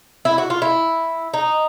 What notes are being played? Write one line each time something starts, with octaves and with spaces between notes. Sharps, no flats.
E4
F#4
F4
E4
D#4